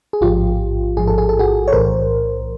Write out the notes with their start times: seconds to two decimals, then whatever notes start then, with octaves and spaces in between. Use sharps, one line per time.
0.13 G#4
0.21 A1 G#2 F3 F4 G4
0.97 A1 G#2 F3 G#4
1.07 A4
1.18 G#4
1.29 A4
1.39 F#4 G#4
1.68 C#5
1.72 B1 A2 E3 A#4 C5